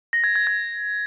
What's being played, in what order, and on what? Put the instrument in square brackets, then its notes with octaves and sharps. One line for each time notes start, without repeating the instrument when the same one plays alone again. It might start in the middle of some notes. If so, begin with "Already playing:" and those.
[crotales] A#6
G#6
G#6
G#6